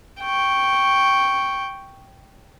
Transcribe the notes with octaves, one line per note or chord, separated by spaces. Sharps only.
G5 C#6